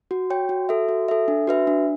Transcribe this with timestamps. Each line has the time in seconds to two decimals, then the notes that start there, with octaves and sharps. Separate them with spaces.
0.11 F#4
0.30 C#5 G5
0.49 F#4
0.69 A4 E5
0.89 F#4
1.08 A4 E5
1.28 D4
1.47 F#4 B4 E5
1.67 D4